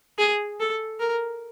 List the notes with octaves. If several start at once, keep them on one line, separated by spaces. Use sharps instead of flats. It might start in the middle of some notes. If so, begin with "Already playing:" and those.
G#4
A4
A#4